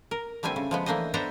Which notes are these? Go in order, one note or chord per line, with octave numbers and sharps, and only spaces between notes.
A#4
D3 G3 A3 C4 G#5
C#3
F3 G#3 B3
E3 A3 A#3 D4 C5 D#5
B3 D4 A4 C5 E5 A#5